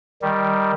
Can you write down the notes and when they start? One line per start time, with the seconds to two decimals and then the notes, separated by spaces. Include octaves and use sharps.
0.22 D#3 G3